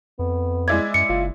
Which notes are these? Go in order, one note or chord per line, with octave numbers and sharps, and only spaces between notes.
F2 B3
G#3 E4 D5 G#6
F#2 C#7
F#1 F4